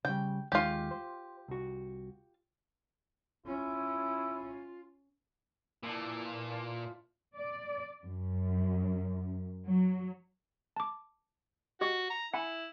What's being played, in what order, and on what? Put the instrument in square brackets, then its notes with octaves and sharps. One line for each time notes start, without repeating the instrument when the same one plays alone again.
[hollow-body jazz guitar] C#3 G3 [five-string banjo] G5
[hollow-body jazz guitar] D#2 G#3 F5 [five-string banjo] F4 G4
[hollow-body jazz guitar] C5
C2 F#4
[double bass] C#4 [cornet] E4 [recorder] F4
[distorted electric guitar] A#2 [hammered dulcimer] E3 F3 D4
[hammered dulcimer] F3 F4
[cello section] D5
F#2
F#3
[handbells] A5 D6
[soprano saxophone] F#4 [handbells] G4 D#5 C#6
[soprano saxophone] A#5
[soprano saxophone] E4 [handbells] F#5 G#5 B5